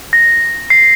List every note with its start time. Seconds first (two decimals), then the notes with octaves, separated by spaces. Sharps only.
0.13 A#6
0.70 C7